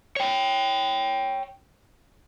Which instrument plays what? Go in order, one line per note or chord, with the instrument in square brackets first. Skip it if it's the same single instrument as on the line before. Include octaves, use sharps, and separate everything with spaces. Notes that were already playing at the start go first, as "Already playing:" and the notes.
[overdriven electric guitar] C#5 G5